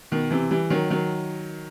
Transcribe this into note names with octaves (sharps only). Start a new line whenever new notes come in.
B2 D#3
C3 E3
E3 G3
D#3 F#3
D#3 F#3